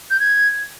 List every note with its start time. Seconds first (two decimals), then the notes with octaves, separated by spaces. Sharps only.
0.11 G6
0.20 G#6